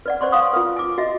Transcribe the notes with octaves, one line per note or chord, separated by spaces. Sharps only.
B4 D5 F#5
B4 C5 D5 C6 C#6
F5 F#5 G#5 C6 C#6 D#6
F4 A#4 B4
G#5 D6
F#4 D#5 E5